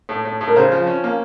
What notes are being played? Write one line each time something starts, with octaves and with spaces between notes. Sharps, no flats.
A2
A2
A2
A#4
C#3 C5
F3
C#4
A#3